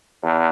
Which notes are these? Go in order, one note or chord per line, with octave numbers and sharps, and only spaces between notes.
E2